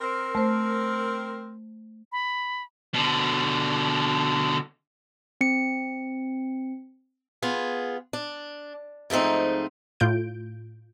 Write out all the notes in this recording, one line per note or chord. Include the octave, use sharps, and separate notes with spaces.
C4 A#4
A3 C5
B5
B2 D3
C4 C#7
B3 F4 G#4
D4
G#2 F3 A3 C4 D#4
A2 F4 G6 D7